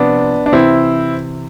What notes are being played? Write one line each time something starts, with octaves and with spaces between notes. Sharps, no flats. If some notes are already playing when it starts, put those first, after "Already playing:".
Already playing: C3 F3 B3 D4
D4
C3 E3 C4 E4